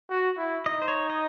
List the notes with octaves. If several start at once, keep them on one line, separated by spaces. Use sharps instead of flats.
F#4
E4
D#4 D#5
C5
C#5
D#5